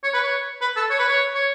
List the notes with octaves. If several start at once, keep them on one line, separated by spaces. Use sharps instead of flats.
C#5
B4
C#5
B4
A4
C#5
B4
C#5
C#5